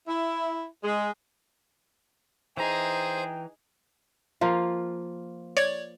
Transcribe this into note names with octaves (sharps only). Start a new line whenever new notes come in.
E4
G#3
E3 D#4 G#4 C5 G5 A#5
F3 A#3 F4
C#5 D5 G#6